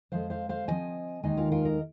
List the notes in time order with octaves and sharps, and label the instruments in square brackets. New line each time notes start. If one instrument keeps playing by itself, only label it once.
[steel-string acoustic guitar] F2 F3 G#3 C5 F5
C5 F5
C5 F5
F2 F3 C4 D#5 G#5
D#2 D#3 G#3 D#4 D#5 G#5
F4 A#4
F4 A#4
A#4 D#5